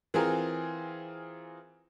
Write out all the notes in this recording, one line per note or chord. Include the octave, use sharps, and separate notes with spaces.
E3 C4 F4 G#4 A#4